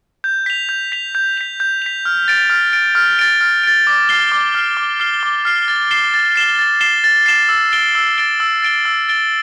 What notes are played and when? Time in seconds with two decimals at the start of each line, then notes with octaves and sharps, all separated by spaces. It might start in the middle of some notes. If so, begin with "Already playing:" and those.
0.24 G6
0.46 B6 F7
0.69 G6
0.92 B6 F7
1.15 G6
1.37 B6 F7
1.60 G6
1.82 B6 F7
2.05 F6
2.28 A6 D7
2.50 F6
2.73 A6 D7
2.95 F6
3.19 A6 D7
3.41 F6
3.63 A6 D7
3.87 D6
4.09 F6 C7 G7
4.32 D6
4.54 F6 C7 G7
4.77 D6
5.00 F6 C7 G7
5.23 D6
5.45 F6 C7 G7
5.68 A6
5.91 C7 E7 G7
6.14 A6
6.36 C7 E7 G7
6.59 A6
6.81 C7 E7 G7
7.04 A6
7.26 C7 E7 G7
7.49 E6
7.72 A6 D7 G7
7.95 E6
8.18 A6 D7 G7
8.40 E6
8.62 A6 D7 G7
8.85 E6
9.09 A6 D7 G7